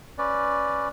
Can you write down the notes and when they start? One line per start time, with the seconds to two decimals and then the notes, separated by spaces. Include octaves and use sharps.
0.18 C#4 B4 D5